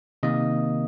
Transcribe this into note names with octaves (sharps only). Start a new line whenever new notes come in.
C3 D#3 A#3 D#5